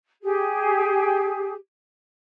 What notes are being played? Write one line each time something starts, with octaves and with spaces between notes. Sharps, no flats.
G4 G#4